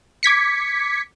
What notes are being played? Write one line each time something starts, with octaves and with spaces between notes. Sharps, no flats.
D6 G#6 B6 C#7